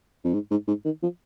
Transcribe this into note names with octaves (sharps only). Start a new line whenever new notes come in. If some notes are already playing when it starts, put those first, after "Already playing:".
F2
G#2
G#2
G#2
D#3
F3